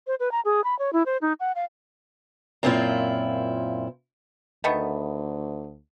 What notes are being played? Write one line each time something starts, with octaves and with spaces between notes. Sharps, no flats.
C5
B4
A#5
G#4
B5
C#5
E4
C5
D#4
F#5
F5
F#2 A#2 C4 C#4 E4 F4
D2 D#3 A3 B3